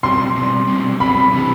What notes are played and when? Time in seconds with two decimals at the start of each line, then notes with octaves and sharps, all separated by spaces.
0.03 B2 G3 C4 C6
0.36 B2 G3 C4
0.67 B2 G3 C4
1.00 B2 G3 C4 B5
1.33 C3 E3 G3